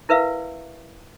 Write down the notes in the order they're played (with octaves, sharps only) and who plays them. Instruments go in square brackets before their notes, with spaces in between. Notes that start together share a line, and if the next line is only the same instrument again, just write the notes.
[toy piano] E4 A#4 B4 E5 F5